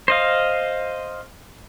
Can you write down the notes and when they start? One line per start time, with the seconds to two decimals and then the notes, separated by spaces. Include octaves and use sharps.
0.08 C5 D#5 F5